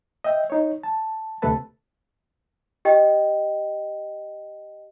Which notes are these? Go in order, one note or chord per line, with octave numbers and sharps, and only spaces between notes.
D#5 E5 G5
D#4 C#5
A5
D2 C3 A3 A4 B4 A5
G4 D#5 G5